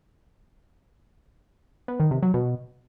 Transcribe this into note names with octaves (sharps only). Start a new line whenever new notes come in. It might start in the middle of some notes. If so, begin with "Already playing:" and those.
B3
D#3
C3
F#3
B2